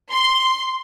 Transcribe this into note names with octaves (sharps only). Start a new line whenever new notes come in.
C6